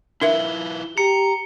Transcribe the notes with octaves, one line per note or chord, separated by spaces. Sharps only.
D4 E4 F4 A#4 B4 E5 G7
G4 A#5 C#7